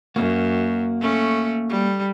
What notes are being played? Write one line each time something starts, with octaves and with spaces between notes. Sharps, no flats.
F#2 A#3 F#4
A3 C#4
G3